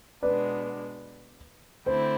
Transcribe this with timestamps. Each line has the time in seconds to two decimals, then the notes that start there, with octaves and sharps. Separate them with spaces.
0.23 B2 G#3 B3 D4 B4 D5
1.86 D3 A3 C4 E4 C5